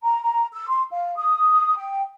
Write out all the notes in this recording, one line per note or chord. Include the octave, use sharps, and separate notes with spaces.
A#5
A#5
E6
C6
F5
D#6
G5